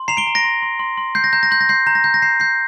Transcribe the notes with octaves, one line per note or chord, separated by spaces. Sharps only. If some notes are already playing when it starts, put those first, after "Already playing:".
Already playing: C6
A#5 C7 F7
D7 G7
A#5
A#6 D7
C6
C6
C6
C6
G6 C7
A#6
A#5 G6
A#6
C6 G6
A#6
C6 G6 C7
A#5 G6
A#6
A#5 G6
A#6
A#5 G6 C7
A#5 G6 C7